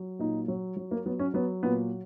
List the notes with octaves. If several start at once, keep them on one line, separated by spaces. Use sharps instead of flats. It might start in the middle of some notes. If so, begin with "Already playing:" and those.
Already playing: F#3
A#2 D#4
F#3
F#3
A#3
F#3 B3
C#4
F#3 B3
A#2 B3